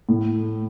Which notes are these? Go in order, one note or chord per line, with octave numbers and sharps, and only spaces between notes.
A2